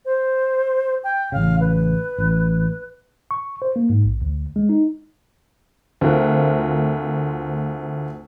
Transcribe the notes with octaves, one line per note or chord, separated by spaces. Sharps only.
C5
G5
A1 C#3 F5
B4
A1
C#6
C5
A#3
G#2
A#1
D2
G#3
D#4
D2 A3 C4 F4 A#4 F#6